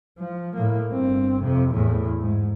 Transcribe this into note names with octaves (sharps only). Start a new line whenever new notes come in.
F3
A2 A#3
G1 C4
F2 C3
E2 A2
G#2